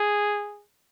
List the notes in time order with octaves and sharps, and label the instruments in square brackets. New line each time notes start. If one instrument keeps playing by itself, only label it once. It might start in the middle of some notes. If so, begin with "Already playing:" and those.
Already playing: [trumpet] G#4